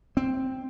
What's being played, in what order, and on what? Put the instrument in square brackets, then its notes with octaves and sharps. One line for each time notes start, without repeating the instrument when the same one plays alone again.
[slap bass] C4